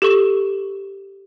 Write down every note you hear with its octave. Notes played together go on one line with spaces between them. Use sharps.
G4 A4 C#6 E7